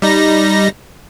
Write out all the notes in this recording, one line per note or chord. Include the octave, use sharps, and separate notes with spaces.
G3 D#4 A#6